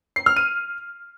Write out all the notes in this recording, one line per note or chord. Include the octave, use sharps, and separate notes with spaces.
C7
F6
D#7